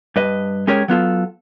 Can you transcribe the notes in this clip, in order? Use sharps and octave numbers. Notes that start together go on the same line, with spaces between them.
G2 B4 D#5
G#3 C#4 G4 G#4 A#4 C#5
F#3 B3 F4 A4